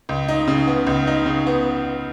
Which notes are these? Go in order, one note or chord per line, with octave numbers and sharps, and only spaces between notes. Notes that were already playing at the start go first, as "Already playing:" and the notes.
C#2
D#4
C#3
B3
C#2
D#4
C#3
B3